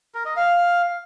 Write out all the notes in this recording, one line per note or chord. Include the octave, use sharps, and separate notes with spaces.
A#4
D#5
F5